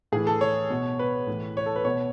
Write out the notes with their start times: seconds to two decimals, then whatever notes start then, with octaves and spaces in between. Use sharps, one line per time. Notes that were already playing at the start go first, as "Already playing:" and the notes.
0.12 A2 E3 G#4
0.27 A4
0.41 C#5
0.70 B2
0.99 B4
1.27 A2 E3
1.57 C#5
1.66 A4
1.76 B4
1.85 B2 C#5